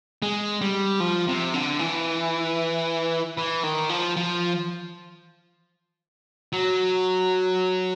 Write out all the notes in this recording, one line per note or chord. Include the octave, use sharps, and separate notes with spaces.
G#3
G3
F3
C3
D3
E3
E3
D#3
F3
F3
F#3